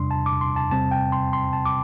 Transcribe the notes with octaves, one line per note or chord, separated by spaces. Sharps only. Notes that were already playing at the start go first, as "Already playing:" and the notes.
Already playing: E2 C3 G3 D4 C6
A5
D6
C6
A5
E2 C3 G3 C4 A5
G5
C6
C6
A5
D6